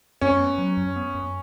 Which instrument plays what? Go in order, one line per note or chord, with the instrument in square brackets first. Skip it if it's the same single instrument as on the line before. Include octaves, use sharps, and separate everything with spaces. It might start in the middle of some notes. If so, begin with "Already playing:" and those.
[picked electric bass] F#2 [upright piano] C#4
[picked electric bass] B3
F#3
F#2
B3
F#2